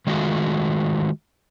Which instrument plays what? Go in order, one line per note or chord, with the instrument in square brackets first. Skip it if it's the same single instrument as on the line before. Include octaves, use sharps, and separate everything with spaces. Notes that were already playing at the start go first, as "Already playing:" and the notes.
[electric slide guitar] D#3 G#3 A3 F4 F#4